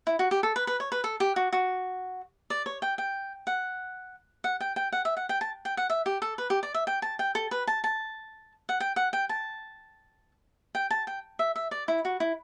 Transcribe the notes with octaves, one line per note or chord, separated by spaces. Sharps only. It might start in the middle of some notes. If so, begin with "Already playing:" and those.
E4
F#4
G4
A4
B4
B4
C#5
B4
A4
G4
F#4
F#4
D5
C#5
G5
G5
F#5
F#5
G5
G5
F#5
E5
F#5
G5
A5
G5
F#5
E5
G4
A4
B4
G4
D5
E5
G5
A5
G5
A4
B4
A5
A5
F#5
G5
F#5
G5
A5
G5
A5
G5
E5
E5
D5
E4
F#4
E4